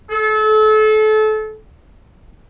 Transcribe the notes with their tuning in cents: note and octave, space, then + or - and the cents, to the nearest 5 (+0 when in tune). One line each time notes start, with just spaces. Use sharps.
A4 -30